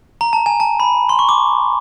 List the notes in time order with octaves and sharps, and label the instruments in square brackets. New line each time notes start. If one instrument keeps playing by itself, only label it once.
[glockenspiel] A#5
A5
G#5
A5
B5
C6
C#6
D6